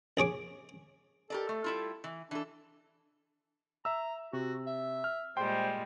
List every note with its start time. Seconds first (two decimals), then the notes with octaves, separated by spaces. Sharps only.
0.17 A#1 G#4 C#5 D6
1.30 G4 A4 A#4 D5
1.49 A3
1.64 G3 E4 F4
2.04 E3
2.31 E3 D4 A4
3.85 E5 A#5 E6
4.33 C3 F#4
4.67 E5
5.04 F6
5.37 A#2 G3 G#3 C5 G5 C6